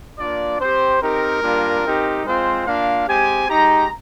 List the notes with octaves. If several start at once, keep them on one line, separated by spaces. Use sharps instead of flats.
A#3 D4 F4 D5
C4 G4 C5
C4 D#4 G4 A#4
G3 A#3 D4 F4
C4 D#4 G4
G#3 C4 F4 C5
A#3 D4 F4 F5
G#3 C4 G4 G#5
G#3 D#4 G4 A#5